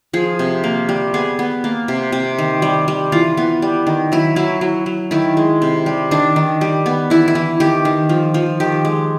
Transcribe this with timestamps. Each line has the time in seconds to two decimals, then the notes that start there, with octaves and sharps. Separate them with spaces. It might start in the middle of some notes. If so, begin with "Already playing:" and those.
0.13 F3 G#4
0.39 C3
0.64 A#3
0.89 G3
1.14 B3 G#4
1.39 B3
1.64 A#3
1.88 C3
2.12 C3
2.39 D#3
2.62 G3
2.88 G3
3.12 E3 F4
3.37 B3
3.62 G3
3.87 D#3
4.12 F#3 E4
4.36 F#3 E4
4.61 F#3
4.86 F#3
5.11 D#3 E4
5.37 G#3
5.62 C3
5.86 G3
6.11 D#3 D4
6.36 D#3
6.61 G3
6.86 B3
7.10 E3 E4
7.28 E4
7.35 E3
7.60 D#3 G4
7.85 D#3
8.09 F3
8.34 F3
8.60 D#3 G4
8.85 G#3